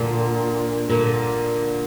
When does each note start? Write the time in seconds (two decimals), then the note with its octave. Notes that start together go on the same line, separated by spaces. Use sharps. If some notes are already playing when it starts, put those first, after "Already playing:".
Already playing: A#2 D3
0.90 A#2 D3